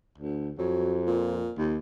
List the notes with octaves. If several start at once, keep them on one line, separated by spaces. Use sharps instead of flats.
D2
F2 F#3
A#2
D#2